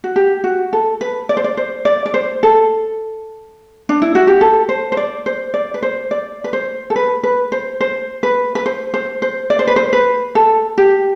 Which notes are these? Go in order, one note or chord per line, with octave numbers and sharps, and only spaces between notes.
F#4
G4
F#4
A4
B4
D5
C5
D5
C5
D5
D5
C5
A4
D4
E4
F#4
G4
A4
C5
C5
D5
C5
D5
B4
C5
D5
B4
C5
A4
B4
B4
C5
C5
B4
B4
C5
C5
C5
D5
C5
B4
C5
B4
A4
G4